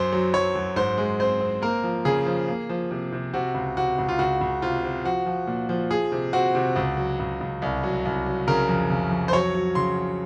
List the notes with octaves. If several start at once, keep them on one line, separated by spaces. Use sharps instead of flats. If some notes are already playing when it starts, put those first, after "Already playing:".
Already playing: F#2 C5
F#3
F#3 C#5
F#2
G#2 C5
G#3
C4 C5
C4
A#3 A#4
F3
C#3 G#4
F3
A#3
F3
C3
C3
C3 F#4
C#2
C3 F#4
C#2
F4
C#2 F#4
C#2
C3 F4
C3
F3 F#4
F3
A#2
F3
F3 G#4
C3
C4 F#4
C3
C#2
F#3
C#2
C#2
C2
F#3
C2
F#3
C#3 A#4
F2
C#3
F2
C5
F#3 C#5
F#3
C#3 C6
F#3